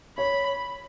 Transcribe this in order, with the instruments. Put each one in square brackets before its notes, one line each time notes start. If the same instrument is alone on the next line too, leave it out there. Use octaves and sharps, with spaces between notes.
[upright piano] C#5 [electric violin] B5